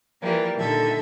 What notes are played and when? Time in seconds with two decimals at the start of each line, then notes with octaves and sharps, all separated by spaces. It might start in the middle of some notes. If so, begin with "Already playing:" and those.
0.22 E3 F3 G3 A#3
0.59 A#2 D3 D#3 G3 A4 E5